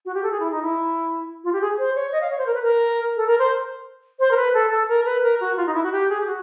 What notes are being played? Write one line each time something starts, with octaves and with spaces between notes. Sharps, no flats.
F#4
G4
A4
G#4
E4
D#4
E4
F4
G4
G#4
C5
C#5
D#5
F5
C#5
C5
A#4
B4
A#4
A4
A#4
C5
C5
A#4
B4
A4
A4
A#4
B4
A#4
F#4
F4
D#4
E4
F#4
G4
G#4
G4
F#4